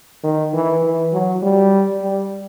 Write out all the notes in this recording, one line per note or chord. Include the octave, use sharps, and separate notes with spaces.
D#3
E3
E3
F#3
G3
G3